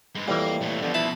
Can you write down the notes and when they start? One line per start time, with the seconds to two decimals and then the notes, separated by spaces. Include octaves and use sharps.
0.15 G2 G#3
0.28 F2 A2 E3 G3 A#3
0.62 A#2 A3
0.83 B2 D3 F3
0.94 E4 A5 B5